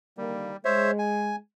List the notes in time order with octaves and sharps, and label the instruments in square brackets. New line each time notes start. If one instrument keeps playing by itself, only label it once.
[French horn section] D3 D#3 A#3 [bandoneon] G3
[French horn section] G#3 [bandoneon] C5 C#5 E5
[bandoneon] G#5